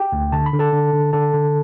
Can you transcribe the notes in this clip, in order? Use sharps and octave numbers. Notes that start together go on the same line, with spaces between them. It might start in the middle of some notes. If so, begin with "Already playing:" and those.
Already playing: G4 G5
D2
D3 A5
B5
D3
A4 A5
D3
D3
D3 A4 A5
D3